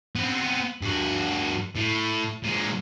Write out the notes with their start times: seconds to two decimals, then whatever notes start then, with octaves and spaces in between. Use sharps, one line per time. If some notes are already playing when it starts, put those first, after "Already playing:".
0.16 B3 C4
0.82 G2 F#4
1.75 A2
2.44 A#2 G#3